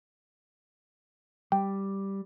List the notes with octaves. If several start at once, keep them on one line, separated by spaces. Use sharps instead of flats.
G3 G5